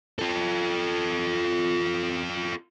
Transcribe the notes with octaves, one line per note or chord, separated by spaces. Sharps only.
F4 A4